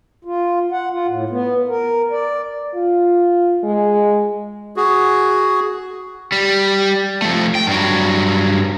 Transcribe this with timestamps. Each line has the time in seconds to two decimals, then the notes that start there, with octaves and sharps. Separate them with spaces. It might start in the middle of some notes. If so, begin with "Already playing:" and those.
0.25 F4
0.72 F#5
0.91 F4
1.07 A2
1.30 B3
1.68 A#4
2.11 D5
2.75 F4
3.63 G#3
4.77 F#4 G#4
6.32 G3
7.22 F3 A3
7.55 G5
7.67 G2 F#3